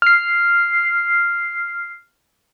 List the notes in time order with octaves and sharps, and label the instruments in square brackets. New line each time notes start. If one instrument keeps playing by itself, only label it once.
[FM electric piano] F6 C7